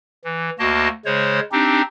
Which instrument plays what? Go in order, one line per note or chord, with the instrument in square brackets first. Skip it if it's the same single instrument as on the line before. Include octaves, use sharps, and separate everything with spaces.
[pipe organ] E3
D2 A#3 F#4 D#5 A5
C#3 G#3 C5 C#5
C4 D4 D#4 G4